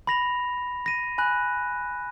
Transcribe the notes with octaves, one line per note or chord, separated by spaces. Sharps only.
B5 A#6 F7
A#6 D#7
G#5 B5 F#6